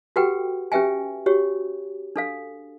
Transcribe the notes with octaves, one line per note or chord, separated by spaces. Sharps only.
F#4 G4 A4 B4 F#5 G5
C#4 G4 B4 E5 G5 G#5
F#4 G4 C#5
D4 A4 F5